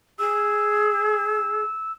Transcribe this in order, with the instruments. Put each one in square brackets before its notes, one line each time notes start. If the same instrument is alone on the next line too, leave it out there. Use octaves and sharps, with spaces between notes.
[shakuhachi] G#4 [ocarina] E6